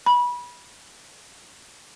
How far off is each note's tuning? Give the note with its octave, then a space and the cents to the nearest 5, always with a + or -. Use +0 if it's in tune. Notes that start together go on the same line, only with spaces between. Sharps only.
B5 -25